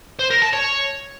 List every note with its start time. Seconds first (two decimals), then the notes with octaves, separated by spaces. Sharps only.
0.19 C5
0.30 A#4
0.42 A5
0.53 C#5